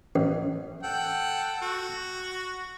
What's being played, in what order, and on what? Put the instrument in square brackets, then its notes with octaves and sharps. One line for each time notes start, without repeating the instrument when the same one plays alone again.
[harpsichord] A1
[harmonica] A4 F#5 G5
F#4